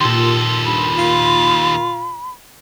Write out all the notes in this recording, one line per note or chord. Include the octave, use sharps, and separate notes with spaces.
D#2 A#2 G4 A4 C6
G2 B5
F4